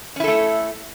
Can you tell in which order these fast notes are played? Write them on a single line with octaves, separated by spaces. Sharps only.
C#4 E4 A4 A3